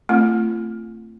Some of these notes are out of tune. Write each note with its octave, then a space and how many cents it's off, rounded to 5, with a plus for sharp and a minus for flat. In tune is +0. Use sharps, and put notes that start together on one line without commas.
A3 +25 C4 +0 F4 -35